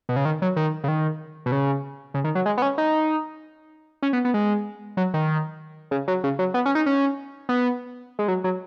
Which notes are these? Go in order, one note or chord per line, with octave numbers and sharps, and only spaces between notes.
B2
C#3
D#3
F#3
D#3
C#3
D#3
B2
C#3
C#3
D#3
F#3
G#3
B3
C#4
D#4
C#4
B3
B3
G#3
F#3
D#3
C#3
F#3
C#3
F#3
B3
C#4
D#4
C#4
B3
G#3
F#3
F#3